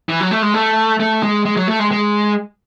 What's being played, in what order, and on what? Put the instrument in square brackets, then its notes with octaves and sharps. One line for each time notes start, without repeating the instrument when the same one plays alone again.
[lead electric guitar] E3
F#3
A3
G#3
A3
A3
G#3
G#3
F#3
A3
G#3
G#3